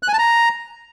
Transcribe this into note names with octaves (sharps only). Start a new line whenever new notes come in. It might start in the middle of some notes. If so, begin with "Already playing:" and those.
F#6
G#5
A5
A#5